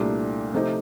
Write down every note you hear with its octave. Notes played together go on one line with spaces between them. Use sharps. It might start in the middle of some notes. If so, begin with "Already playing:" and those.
Already playing: C2 A#2 A3 D4 G4
C3 F3 A3 D#4 G4